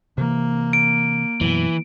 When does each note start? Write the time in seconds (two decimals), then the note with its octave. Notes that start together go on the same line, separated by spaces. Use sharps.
0.18 C3 E3 A#3
0.73 D7
1.41 F#2 B2 E3